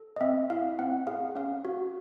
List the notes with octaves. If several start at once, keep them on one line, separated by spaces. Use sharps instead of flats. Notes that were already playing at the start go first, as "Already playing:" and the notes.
Already playing: A4
D#5
C4 E5
E4 F5
C4 F#5
G#4 F5
C#4 F5
F#4